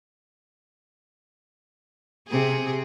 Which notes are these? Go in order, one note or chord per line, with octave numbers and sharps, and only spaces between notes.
C3 G#4